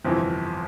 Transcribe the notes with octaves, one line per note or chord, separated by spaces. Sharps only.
G1 F2 C3 E3